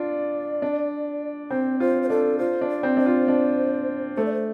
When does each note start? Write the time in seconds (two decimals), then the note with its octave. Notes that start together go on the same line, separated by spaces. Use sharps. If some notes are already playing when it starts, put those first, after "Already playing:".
Already playing: D4 F4 D5
0.62 D4
1.50 C4 C5
1.80 F4 C5
2.03 C5
2.10 D4 A4
2.39 F4 C5
2.61 D4
2.69 D5
2.83 C4
2.97 D4 C5
3.06 F4
3.28 D4
4.17 A3 C5
4.25 D5
4.33 C5